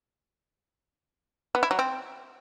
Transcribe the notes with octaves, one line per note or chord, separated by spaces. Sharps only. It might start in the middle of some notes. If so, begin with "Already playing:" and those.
B3
E4
F#3
C4